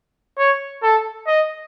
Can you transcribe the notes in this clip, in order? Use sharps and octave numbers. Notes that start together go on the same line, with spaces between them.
C#5
A4
D#5